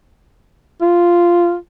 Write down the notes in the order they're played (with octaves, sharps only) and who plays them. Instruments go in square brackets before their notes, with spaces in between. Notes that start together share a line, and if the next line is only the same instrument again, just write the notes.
[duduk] F4